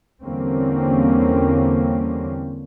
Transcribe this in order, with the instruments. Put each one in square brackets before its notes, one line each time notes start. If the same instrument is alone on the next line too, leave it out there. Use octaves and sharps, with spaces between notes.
[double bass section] E2 D3 G3 A#3 C4 C#4